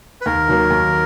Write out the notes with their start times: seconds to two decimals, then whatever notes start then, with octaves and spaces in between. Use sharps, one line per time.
0.21 B4
0.26 D#2 A#4
0.48 D#3 F#3 A#3
0.70 D#2